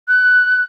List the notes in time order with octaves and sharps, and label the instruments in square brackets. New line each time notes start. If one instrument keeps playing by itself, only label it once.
[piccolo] F#6